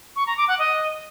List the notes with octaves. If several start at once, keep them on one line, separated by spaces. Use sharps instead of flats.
C#6
A#5
D6
F#5
D#5